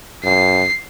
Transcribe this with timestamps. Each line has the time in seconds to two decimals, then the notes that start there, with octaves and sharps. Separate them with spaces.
0.24 F#2 C7